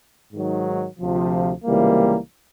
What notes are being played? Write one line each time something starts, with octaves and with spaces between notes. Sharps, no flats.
G#2 D#3 F#3
D2 C3 F3
C#2 C3 E3 G3 A#3